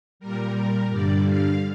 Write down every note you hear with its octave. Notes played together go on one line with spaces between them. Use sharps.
A#2 G3 A#4
A#4
G2 D3 G3 D5
F5